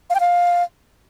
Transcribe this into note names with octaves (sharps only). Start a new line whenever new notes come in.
F5
G5
F5